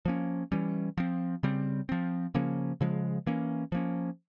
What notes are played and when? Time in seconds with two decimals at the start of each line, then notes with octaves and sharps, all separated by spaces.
0.05 F3 A#3 C#4
0.52 E3 G3 C#4
0.97 F3 C4
1.43 C#3 G3 C4
1.89 F3 C4
2.34 C#3 F3 A#3 C#4
2.81 C#3 F3 G#3
3.27 E3 A#3 C#4
3.72 F3 A#3 C#4